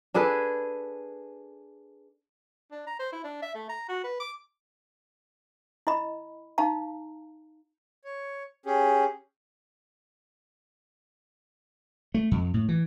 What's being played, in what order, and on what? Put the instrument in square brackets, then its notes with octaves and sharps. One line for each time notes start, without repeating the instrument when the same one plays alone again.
[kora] D4 G#4 A4 B4
[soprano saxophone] D4
A#5
C5
E4
D4
E5
A3
A#5
F#4
B4
D6
[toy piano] E4 D#5 B5
D#4 F5 A5 A#5
[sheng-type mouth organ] C#5
C#4 G4 G#4
[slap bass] A3
F2
A2
E3